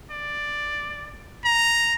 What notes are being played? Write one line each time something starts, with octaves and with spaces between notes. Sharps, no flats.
D5
A#5